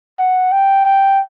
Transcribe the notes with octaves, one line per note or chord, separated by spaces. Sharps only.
F#5
G5
G5